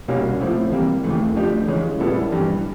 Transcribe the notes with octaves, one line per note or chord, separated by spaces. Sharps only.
C2 B2 G3 A#3 C#4
F3 A3 C4 E4
C3 E3 G3 A#3
D#2 C#3 E3 A3
F3 A3 D4 G4
C#3 E3 G#3 C#4
A#2 G3 B3 E4 A4
G2 E3 G3